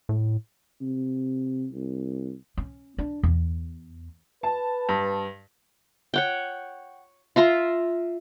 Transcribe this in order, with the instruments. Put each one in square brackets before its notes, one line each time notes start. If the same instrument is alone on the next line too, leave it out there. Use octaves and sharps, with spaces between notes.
[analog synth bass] A2
[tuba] C3
C2
[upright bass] C#4
D4
E2
[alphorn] B4 [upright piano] A5
[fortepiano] G2
[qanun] C#5 F#5 G5
F4 E5 A#5 C6